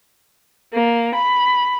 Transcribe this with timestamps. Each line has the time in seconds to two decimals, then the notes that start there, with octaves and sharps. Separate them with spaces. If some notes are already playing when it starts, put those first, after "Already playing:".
0.74 A#3
1.15 B5